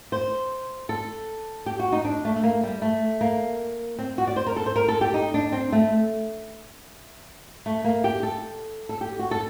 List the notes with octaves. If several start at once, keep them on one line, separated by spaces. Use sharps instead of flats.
C5
A4
G4
F#4
D#4
D4
A3
A3
A#3
G3
A3
A#3
C4
F#4
D5
C5
A#4
A4
C5
A#4
A4
G4
D#4
D4
C4
A3
A3
A#3
G4
A4
A4
G4
F#4
A4